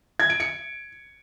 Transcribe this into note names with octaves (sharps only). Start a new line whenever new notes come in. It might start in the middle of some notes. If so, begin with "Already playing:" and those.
G#6
D7
C#7